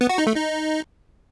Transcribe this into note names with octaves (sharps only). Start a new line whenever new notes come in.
B3
F#4
D#4
A3
D#4